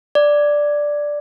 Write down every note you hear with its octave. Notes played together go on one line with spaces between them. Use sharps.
D5